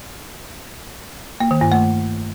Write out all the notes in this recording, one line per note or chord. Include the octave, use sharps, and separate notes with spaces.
A#3
D#3
G2
A3